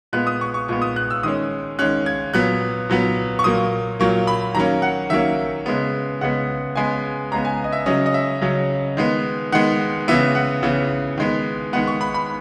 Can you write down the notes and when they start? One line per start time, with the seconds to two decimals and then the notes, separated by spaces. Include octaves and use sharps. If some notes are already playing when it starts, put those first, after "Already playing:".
0.13 A#2 G#3 B3 F#6
0.27 D#6
0.41 C#6
0.54 C#6
0.68 A#2 G#3 B3 C#6
0.82 D#6
0.96 F#6
1.10 E6
1.23 D#3 G#3 C#4 D#6
1.79 D#3 G#3 C#4 F#6
2.06 G#6
2.34 A#2 F#3 B3 F#6
2.89 A#2 F#3 B3
3.39 C#6
3.44 A#2 F#3 A#3 D#6
4.00 A#2 F#3 A#3 C#6
4.27 B5
4.55 D#3 F#3 A#3 C#4 A#5
4.82 F#5
5.10 D#3 F#3 A#3 C#4 E5
5.66 C#3 G#3 B3
6.21 C#3 G#3 B3 F#5
6.76 C#3 G#3 B3 G#5
7.32 C#3 G#3 B3 A#5
7.45 G#5
7.64 D#5
7.72 E5
7.86 C#3 F#3 C#4 D#5
8.06 D#5
8.14 E5
8.42 C#3 F#3 C#4
8.97 D#3 G#3 B3
9.52 D#3 G#3 B3 F#5
10.08 C#3 E3 B3 E5
10.35 F#5
10.63 C#3 E3 B3
11.17 D#3 G#3 B3
11.73 D#3 G#3 B3 F#5
11.87 C#6
12.01 B5
12.14 B5